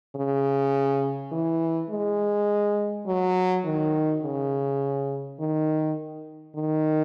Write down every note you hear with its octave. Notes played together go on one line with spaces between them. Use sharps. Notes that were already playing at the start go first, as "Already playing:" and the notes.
C#3
E3
G#3
F#3
D#3
C#3
D#3
D#3